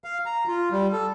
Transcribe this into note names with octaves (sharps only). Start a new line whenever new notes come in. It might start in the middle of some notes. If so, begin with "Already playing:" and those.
F5
A#5
F4
G3
A4